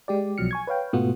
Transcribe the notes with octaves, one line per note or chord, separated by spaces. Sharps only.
G#3 G4 D5
B1 B2 F3 F#3 F6 C#7
G#5 C#6 G#6
B4 C#5 F5 G5
G#2 B2 A3 B3 F4 F#4